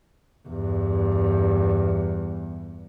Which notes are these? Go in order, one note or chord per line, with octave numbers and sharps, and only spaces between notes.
E2 G2